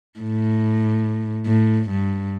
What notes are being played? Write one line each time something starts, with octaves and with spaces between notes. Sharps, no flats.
A2
A2
G2